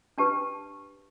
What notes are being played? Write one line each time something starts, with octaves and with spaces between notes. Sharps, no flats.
D4 G4 B4 A5